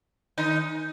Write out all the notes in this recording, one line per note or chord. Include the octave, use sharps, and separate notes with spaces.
D#3 D#4